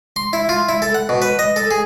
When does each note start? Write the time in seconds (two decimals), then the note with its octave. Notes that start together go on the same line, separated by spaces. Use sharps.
0.16 C6
0.33 E4
0.49 F4
0.69 E4
0.82 A4
0.94 F#5
1.09 B2
1.22 B4
1.39 D#5
1.56 A4
1.71 G#4